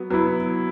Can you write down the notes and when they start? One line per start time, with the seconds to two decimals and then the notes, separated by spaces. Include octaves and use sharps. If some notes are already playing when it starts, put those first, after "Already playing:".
Already playing: F#3 B3
0.10 F#3 B3 E4